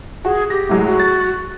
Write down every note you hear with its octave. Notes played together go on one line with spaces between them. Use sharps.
F#4 G#4
G4 A#6
A2 F#3 G#3
F#4
A6